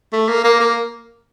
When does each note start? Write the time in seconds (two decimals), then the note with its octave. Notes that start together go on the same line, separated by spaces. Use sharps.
0.13 A3
0.28 A#3
0.44 A#3
0.60 A#3